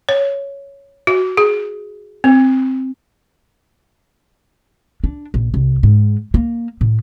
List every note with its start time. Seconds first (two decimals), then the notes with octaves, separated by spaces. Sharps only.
0.09 C#5
1.07 F#4
1.37 G#4
2.24 C4
5.04 D4
5.34 A#1
5.54 C2
5.83 G#2
6.34 A#3
6.81 A2